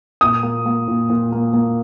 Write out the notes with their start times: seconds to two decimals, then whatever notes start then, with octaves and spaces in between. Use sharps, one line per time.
0.21 A#2 D#6
0.43 A#3
0.66 A#3
0.88 A#2
1.10 A#2
1.32 A#3
1.54 A#3